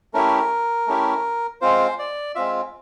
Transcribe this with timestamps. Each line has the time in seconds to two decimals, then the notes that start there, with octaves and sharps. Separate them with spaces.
0.14 A3 C#4 E4 G4 A#4
0.87 A3 C#4 E4 G4
1.61 G#3 C4 F4 C5
1.99 D5
2.35 G#3 C4 F4 E5